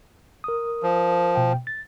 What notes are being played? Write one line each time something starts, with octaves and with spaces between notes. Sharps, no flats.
A#4 D#6
F3
B2 G5
A6